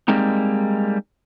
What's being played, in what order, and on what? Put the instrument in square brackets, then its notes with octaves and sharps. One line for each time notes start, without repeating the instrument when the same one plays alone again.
[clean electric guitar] G3 G#3 A#3 C4 D#4